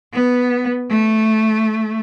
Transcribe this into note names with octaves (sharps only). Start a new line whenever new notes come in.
B3
A3